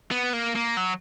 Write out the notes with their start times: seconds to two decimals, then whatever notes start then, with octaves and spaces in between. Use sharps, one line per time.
0.11 B3
0.33 A#3
0.55 A#3
0.77 F#3